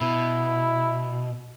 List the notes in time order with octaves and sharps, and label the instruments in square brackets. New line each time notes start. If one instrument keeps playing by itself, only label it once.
[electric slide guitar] B2 [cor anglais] E4